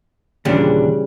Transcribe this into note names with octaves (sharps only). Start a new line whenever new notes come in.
D#2 A#2 C#3 E3 G3 D4